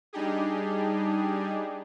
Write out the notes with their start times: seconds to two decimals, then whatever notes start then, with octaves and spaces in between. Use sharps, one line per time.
0.13 G3 D4 D#4 G4 G#4